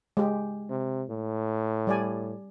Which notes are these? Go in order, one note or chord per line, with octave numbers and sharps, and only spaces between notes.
G#3 G4
C3
A2
G3 D5 G#5